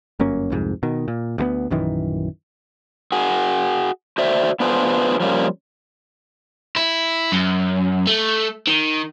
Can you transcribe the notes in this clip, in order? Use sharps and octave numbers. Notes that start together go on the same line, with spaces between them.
G1 F#2 A#3 C#4
C2 F2 G#2
B2 D#3
A#2
D2 G#3 B3
A#1 F#2 D#3 E3
F#4 G#4
F#4 C5 D5 E5
B3 D4 F4 G#4 B4 C5
F3 G3 A#3 C#4
E4
F#2
A3
D#3